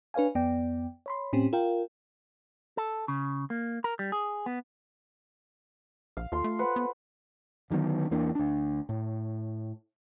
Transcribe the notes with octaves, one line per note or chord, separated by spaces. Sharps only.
D4 B4 C#5 F5 G#5
F2 B3 D5 G5
C#5 B5 C6
A2 C4 C#4 G4
F4 A#4 F5 G5
A4
C#3
A#3
A#4
G3
G#4
B3
A#1 F5
D#2 F4 A4 C6
A3
B4 C5 F#5
B3
D3 D#3 F#3 B3
E2 E3 A#3 D4
D2 D4
A2